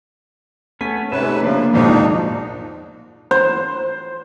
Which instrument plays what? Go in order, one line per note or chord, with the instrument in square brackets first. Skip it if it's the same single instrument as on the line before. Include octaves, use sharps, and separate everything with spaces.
[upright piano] A3 [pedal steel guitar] B3 C#4 G#5 [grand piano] B6
[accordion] G#2 C3 B4 [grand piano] A3 [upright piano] C#4 [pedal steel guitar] E5
[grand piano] C#3 D4 [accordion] F3 [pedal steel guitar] A#3
[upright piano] B1 F2 G#2 [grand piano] D#3 F3 G#3 [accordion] D4 D#4
[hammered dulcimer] C5